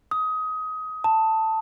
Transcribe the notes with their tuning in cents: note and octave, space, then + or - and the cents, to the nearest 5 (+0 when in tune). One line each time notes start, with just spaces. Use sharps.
D#6 +20
A5 +10